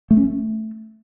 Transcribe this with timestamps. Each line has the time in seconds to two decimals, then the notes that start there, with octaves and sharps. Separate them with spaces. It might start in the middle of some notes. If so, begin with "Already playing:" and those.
0.11 A3
0.17 C#4
0.23 A3